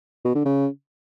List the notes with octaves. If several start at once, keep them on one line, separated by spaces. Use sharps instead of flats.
B2
D3
C#3